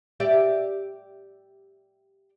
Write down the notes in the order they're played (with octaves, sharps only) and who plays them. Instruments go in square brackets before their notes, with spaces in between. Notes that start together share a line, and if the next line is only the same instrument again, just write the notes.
[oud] G4 D5 E5